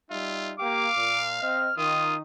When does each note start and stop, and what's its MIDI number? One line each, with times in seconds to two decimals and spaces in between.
0.10 0.55 55
0.10 0.55 63
0.10 0.53 65
0.10 0.55 76
0.60 0.87 58
0.60 0.87 67
0.60 1.64 77
0.60 0.87 79
0.60 1.24 86
0.96 1.40 46
1.41 1.69 60
1.41 1.69 75
1.41 1.75 89
1.77 2.21 51
1.77 2.16 65
1.77 2.17 87